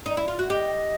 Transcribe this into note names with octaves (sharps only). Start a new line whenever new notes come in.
D#4
E4
F4
F#4
G4 D#5